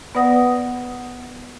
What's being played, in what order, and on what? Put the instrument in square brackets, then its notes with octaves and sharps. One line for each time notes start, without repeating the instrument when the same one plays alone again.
[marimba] B3 B4 D5 F#5 D#6 A#6